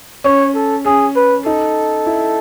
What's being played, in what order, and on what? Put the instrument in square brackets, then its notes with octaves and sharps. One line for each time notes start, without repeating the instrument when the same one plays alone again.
[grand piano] C#4 [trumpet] C#5
[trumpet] A4
[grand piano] C#4 [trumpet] G#4
[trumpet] B4
[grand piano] D#4 [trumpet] A4
[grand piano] E4